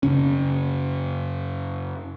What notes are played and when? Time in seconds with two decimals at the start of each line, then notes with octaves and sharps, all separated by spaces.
0.03 F#2 C#3 C#4